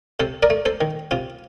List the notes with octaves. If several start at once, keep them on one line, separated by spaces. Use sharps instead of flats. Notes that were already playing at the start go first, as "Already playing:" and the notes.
C3 A4 C5
A#4 D5
A3
A4 C5
D#3
C3 F4